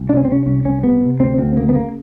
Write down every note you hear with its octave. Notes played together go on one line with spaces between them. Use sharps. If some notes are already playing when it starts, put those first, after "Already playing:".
Already playing: C2
C3 D4
C#4
C4
C3 C#4
C2 C#4
C2 C#4
C3 B3
C3
D2 C4
D2 C4
C#3 A#3
B3
C#3 A#3